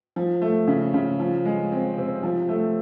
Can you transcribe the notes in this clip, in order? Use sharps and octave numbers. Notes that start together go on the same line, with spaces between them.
F3
A3
C#3
C#3
F3
G#3
C4
C3
F3
A3